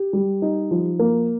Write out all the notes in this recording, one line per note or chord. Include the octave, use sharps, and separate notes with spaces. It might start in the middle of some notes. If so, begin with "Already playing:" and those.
Already playing: G4
G3
D#4
F3
A#3